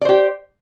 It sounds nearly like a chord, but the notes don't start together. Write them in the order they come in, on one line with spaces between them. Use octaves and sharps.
D5 C5 G4